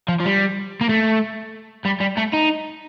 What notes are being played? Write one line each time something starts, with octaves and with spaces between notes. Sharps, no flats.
F3
F3
G3
A#3
A3
G3
G3
A3
D#4